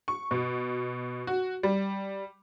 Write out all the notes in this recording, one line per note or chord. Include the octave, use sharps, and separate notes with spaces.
C#6
B2
F#4
G3